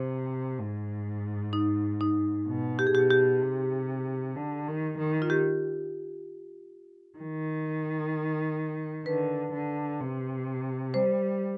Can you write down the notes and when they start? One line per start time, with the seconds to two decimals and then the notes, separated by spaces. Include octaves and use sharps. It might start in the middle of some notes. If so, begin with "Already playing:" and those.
Already playing: C3 C5
0.59 G#2
1.53 D#4
2.01 D#4
2.47 B2
2.79 G4
2.87 G#4
2.94 B2 G4
3.10 G4
3.41 C3
4.35 D3
4.67 D#3
4.98 D#3
5.22 F4
5.30 G4
7.18 D#3
9.06 D3 B4
9.53 D3
10.00 C3
10.94 G3 C5